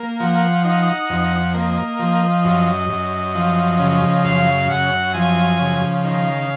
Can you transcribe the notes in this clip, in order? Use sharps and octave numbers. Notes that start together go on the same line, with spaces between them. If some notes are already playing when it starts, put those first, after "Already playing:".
Already playing: A#3
F3 F#5
D#4 F#5
F2
A#3 D#5
F3
F#2
F#2
F3
C#3
F#2 F5
F#2 F#5
F3 G#5
C#3
D#3 F5